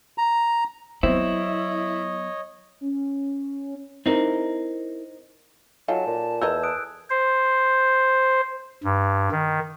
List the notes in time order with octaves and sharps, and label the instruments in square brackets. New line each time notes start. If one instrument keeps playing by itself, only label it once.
[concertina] A#5
[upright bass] F#3 B3 [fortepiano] C4 [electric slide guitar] E4 [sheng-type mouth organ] C#5 D#5
[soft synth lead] C#4
[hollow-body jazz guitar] C4 D#4 [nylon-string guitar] E4 A#4
[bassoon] F#3 [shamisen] D#4 F4 A4 [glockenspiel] G#5 [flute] A5
[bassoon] A#2
[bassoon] E2 [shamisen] A4 A#4 D#5 [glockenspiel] E6 G6 G#6
[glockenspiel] D#6 F#6 D7
[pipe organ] C5
G2
D#3